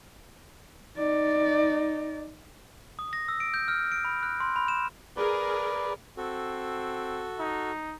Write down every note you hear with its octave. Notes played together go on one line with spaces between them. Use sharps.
D#4 D5
D#6
A#6
E6
D7
G6
F6
D7
B5
F#6
C6
B5
E7
G#4 A#4 B4 D5
C4 F#4 A4
D#4